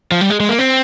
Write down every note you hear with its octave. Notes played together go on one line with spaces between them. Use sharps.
F3
G3
G#3
G#3
A#3
C4